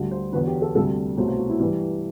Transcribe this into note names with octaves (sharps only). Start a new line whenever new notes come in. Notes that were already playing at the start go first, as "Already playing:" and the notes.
Already playing: D2 D3 G3
C5
E2 D3 F#3 B4
G4
A4
D2 C3 G3 A4
C2 B2 F#3 A3 C5
C5
F#4
E4
G2 E3 G3